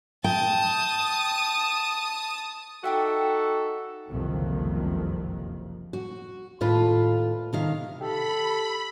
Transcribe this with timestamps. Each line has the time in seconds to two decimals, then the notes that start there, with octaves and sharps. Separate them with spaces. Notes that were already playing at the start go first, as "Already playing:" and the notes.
0.24 G5 A5 D#6
2.84 D#4 F#4 A4 E5 G5 D6
4.09 F#1 C2 F2 C3 D#3 F3
5.93 F#4
6.61 D#2 A2 F4 B4
7.53 C3 D#3 F5
8.01 G4 A4 B5